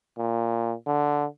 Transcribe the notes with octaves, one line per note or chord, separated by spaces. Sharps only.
A#2
D3